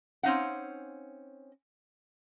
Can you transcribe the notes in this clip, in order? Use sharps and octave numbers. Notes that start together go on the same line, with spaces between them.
C4 C#4 D#4 F5 F#5